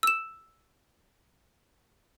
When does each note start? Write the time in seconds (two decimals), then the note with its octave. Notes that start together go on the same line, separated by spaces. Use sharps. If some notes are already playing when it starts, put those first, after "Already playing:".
0.03 E6 E7